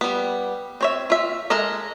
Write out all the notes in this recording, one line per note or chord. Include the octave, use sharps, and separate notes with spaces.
G3 B3
C4 C#5 E5
F4 E5
G#3 A4 A#4 D#5